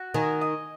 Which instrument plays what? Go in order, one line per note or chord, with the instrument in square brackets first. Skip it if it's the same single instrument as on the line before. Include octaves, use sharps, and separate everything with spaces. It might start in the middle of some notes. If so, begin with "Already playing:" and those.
Already playing: [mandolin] F#4
[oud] D#3 [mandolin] G#5
[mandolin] D#5